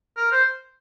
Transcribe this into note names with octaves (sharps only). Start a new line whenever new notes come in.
A#4
C5